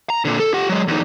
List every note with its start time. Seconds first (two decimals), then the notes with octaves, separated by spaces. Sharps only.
0.10 A#5
0.25 A#2 D3
0.40 A4
0.54 G4 F#5
0.69 F#3 G#3
0.88 E2 D#4